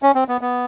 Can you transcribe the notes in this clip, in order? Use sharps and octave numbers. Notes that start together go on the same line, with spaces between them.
C#4
C4
B3
B3